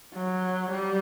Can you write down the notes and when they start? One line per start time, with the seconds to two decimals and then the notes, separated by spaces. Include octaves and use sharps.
0.14 F#3
0.71 G3